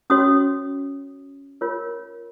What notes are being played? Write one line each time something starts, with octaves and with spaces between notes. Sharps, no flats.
C#4 F#4 C#5 D#6
F4 A#4 C#5